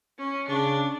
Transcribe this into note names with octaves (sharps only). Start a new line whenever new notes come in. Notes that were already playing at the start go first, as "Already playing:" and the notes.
C#4
C#3 D4